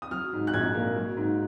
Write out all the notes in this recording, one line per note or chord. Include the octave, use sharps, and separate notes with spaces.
D#6
F#3 F6
G#2
F#6
A#1 G#6
A#3
F#3
G#2